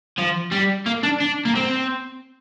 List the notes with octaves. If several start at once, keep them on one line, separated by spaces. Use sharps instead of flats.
F3
G3
A#3
D4
D4
A#3
C4